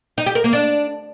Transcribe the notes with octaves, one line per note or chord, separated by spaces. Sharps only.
D#4
G4
A#4
A#3
D4